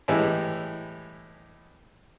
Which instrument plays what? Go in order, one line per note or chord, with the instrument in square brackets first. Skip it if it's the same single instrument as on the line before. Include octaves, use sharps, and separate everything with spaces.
[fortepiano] A2 E3 G3 G#3